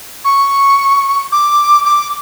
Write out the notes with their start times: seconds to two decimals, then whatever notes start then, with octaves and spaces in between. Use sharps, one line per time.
0.25 C#6
1.32 D6
1.85 D6